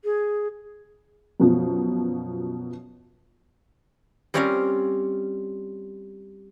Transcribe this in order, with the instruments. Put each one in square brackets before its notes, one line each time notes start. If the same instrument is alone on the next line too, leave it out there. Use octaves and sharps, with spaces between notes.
[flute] G#4
[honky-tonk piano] F#2 B2 F3
[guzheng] G3 C4 C#4 F4 A#4 F5